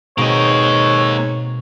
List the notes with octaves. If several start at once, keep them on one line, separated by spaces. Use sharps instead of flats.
G#2 B2 G#3 A#3 C4 C#5 D#5